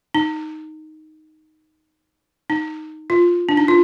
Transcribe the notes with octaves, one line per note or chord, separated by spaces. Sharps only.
D#4
D#4
F4
D4
D#4
F4